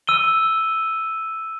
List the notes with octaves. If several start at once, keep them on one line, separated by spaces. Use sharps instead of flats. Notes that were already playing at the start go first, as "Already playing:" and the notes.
E6 D#7 G7